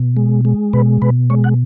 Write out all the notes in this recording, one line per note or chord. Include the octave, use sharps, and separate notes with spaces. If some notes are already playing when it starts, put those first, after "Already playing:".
Already playing: B2
G#3
G#3
B2 B4
B2 B4
G#3 C#5
F#5